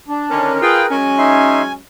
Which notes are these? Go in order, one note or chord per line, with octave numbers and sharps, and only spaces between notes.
D4
D3 D#3 C#4 A#4
F4 G#4 B4 G5
F#3 G#3 C#4 G#5
D#4 E5 C6